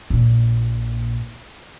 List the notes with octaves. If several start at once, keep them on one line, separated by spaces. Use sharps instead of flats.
A#1 A#2